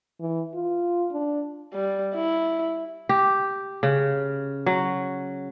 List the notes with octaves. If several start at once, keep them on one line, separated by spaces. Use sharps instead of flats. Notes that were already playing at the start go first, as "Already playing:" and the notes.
E3
F4
D4
G3
E4
G4
C#3
F#3